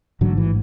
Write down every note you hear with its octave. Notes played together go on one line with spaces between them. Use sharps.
A1 G#2 D3 F#3
E3